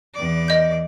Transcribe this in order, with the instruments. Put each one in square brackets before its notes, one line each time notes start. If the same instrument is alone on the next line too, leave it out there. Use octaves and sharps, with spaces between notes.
[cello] E2 D5
[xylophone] D#5 G6